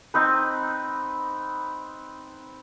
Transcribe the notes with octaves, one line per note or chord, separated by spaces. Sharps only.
C4 D#4 B4